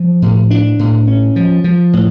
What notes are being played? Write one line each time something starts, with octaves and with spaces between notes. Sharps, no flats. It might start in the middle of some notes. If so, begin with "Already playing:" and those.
Already playing: F3
A2
D4
A2
C#4
F3
F3
A2